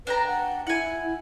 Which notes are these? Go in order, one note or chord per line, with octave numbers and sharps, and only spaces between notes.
D4 B4 G5 A#5
F#5
E4 F#5 G#5